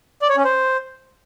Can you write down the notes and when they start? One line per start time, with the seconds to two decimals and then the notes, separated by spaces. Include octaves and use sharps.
0.22 D5
0.29 C#5
0.37 C#4
0.45 C5